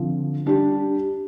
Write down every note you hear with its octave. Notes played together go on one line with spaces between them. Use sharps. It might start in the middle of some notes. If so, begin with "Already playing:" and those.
Already playing: D3 F3 C4
G3 D4 G4